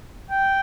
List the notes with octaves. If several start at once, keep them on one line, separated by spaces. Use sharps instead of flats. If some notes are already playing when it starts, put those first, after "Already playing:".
G5